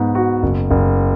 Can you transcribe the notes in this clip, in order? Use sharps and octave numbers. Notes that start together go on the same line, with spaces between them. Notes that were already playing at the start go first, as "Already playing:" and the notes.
Already playing: G#2 B3
F#4
F#1
F#1